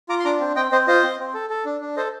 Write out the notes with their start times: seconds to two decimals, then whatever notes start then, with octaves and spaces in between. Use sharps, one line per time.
0.09 F4 A#5 D6
0.20 C6
0.25 D4 A#5 D6
0.40 C4
0.56 C4 D#5 G5
0.71 C4 C5 D#5
0.87 F4 C5 D#5
1.03 C4
1.19 C4
1.34 A4
1.50 A4
1.65 D4
1.81 D4
1.97 A4 C5 D#5